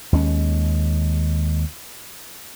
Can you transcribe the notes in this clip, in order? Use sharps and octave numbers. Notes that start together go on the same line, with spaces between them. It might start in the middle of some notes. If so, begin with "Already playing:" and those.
D#2 G#3 C#4